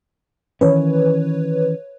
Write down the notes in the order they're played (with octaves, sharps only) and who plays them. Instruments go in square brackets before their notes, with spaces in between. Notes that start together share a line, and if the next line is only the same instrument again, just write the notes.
[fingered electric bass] D#3 E3 C#4 [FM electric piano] B4 C#5